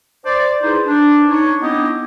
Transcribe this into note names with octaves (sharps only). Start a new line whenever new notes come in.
C5 D5
D#4 E4 G#4 B4 C5
D4
D#4 C#5
B3 C4 D4 E4 G4 D#5